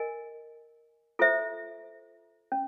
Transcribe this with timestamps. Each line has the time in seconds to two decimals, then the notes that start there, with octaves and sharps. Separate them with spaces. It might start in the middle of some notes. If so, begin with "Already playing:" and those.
Already playing: A#4 D#5 G#5
1.19 F4 A4 C5 E5
2.52 C#4